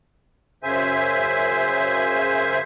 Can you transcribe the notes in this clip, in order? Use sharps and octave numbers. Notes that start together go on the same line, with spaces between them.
F#2 C#3 C5 E5 G#5